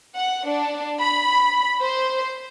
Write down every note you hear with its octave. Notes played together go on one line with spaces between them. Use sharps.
F#5
D4
B5
C5